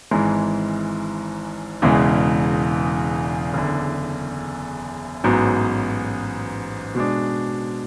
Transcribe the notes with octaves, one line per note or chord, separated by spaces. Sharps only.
G#1 G#2 E3 G#3
E1 E2 C#3 E3 G#3
F#1 E2 D3
A1 G#2 F#3 B3
B2 G#3 D4